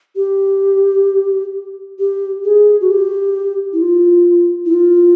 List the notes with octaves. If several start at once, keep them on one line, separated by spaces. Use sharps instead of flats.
G4
G4
G#4
F#4
G4
E4
F4
E4
F4